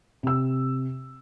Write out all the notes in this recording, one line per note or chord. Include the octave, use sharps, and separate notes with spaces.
C3 E6